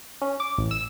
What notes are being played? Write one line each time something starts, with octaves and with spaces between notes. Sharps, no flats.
C#4
D6
A1
E6